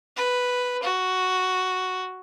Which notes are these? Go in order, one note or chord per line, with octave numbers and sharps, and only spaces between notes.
B4
F#4